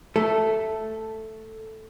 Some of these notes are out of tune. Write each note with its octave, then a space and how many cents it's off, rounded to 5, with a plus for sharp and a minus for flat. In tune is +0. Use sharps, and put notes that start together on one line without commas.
A3 +0 A4 +0